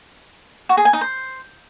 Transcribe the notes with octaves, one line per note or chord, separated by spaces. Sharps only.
F#4
G#4
G#5
D#4
C5